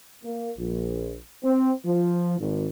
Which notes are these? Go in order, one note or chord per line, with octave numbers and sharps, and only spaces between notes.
A#3
A#1
C4
F3
G#1